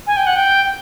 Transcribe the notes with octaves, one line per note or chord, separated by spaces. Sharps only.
G#5
G5
F#5
G5